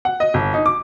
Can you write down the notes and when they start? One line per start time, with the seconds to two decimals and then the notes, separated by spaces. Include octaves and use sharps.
0.05 F#5
0.20 D#5
0.34 G1
0.54 D#4
0.66 D6